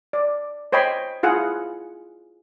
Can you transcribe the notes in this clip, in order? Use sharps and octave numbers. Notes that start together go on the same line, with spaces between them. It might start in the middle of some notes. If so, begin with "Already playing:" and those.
D5
C5 C#5 D#5 G5 B5 C6
E4 F4 G#4 F#5